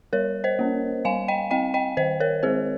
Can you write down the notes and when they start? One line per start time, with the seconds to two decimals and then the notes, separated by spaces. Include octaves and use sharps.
0.13 G3 A#4 C#5
0.44 C5 D#5
0.59 A#3 C#4
1.05 G3 F5 G#5
1.28 D#5 G5
1.51 C4 D#5 G5
1.74 D#5 G5
1.97 D#3 C5 D#5
2.20 A#4 C#5
2.43 G#3 C4 G#4 C5